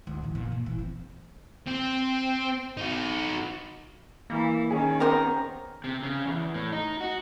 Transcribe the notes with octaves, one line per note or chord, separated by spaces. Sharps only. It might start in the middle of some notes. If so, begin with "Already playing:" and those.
D2
A#2 E3
A#2
A#2
E3
C4
C4
D#4 F#4
E3 A#3
D#3 C#4 G#4
B3 C4 G4 A#4
C3
C#3
E2
A2
D#4
F#4